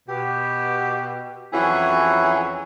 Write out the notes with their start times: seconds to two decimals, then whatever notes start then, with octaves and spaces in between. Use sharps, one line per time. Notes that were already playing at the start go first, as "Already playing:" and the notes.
0.09 B2 G4
1.53 F2 E3 F#3 C#4 E4 G#4